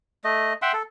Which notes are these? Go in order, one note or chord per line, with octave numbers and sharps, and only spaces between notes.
A3 D#5
E5 F#5 G5 C6
A4